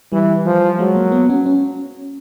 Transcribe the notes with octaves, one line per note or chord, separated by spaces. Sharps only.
E3 G3
F3
F#3 G#3
A#3
B3
C#4
C#4